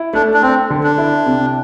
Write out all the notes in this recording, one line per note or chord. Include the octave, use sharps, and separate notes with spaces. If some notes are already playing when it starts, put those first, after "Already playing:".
Already playing: E4
A3 D4
D4
C4 A4
D3
D4
E4
C3